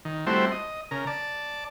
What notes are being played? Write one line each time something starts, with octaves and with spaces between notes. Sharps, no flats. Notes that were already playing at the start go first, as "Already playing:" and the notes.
D#3
G3 A3 C4 E4 F#4 C5
D#5
C#3 A#4
D5 A5